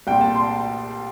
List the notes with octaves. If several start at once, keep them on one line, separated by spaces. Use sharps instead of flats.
C2 A#2 G5
A5
C6